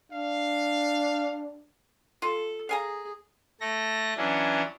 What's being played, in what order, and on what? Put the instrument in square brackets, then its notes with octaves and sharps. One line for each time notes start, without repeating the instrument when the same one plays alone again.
[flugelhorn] D4 [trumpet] F5
[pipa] F4 [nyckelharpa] A4
[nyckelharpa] G#4 [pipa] F5 G#5 A#5
[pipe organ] A3 A4 A#6
E3 F#3 C#4 D4